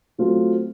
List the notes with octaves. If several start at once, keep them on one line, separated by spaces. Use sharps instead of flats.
F#3 A3 C4 F4